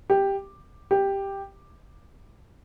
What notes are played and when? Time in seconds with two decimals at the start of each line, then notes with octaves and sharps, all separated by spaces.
0.10 G4
0.91 G4